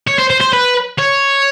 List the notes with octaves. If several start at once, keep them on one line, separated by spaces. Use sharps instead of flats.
C#5
C5
C5
C5
B4
C#5